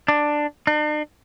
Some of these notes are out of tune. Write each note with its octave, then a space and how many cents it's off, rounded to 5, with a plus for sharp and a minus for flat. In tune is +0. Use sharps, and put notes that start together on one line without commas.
D4 +10
D4 +45